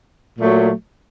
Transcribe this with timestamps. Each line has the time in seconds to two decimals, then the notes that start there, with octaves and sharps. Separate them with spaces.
0.39 A#2 F#3 A3